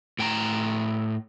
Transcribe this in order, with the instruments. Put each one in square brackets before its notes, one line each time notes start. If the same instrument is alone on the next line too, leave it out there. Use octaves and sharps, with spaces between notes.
[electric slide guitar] A2 G5 A5 A#5